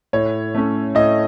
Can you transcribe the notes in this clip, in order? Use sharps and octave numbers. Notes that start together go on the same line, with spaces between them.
A2 C#5
A3 C#4
A2 D#5